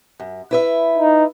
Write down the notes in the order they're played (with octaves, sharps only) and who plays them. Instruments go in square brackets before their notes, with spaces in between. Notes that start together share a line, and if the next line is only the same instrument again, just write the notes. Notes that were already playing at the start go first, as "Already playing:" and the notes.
[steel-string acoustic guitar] F#2
E4 B4 E5
[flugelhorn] D#4